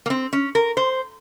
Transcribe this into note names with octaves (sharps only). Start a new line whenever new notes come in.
A#3
C4
C#4
A#4
C5